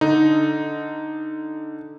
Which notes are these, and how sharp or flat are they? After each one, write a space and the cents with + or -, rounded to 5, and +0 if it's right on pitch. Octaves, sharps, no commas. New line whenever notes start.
D3 +0 D#4 +0